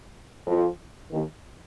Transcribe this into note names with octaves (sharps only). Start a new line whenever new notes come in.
F2 F3
D#2 D#3